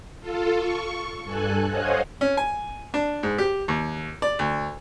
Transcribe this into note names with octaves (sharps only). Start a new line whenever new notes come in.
F4 A4
C#6
G2 A4 G#5 F#6
C5 C#5 D#5 F5 F#5 G#5
C#4
G#5
D4
G#2
G4
D#2
D5
D2